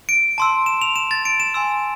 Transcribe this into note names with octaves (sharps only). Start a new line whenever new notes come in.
D7
A5 C6 E6
E7
F7
E7
A6
D7
E7
G#5 C6 E6